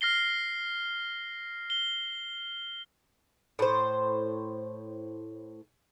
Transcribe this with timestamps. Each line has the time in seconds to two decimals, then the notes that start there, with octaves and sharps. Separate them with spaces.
0.01 F6 A#6 C7 G7
1.70 G7
3.59 A2 C5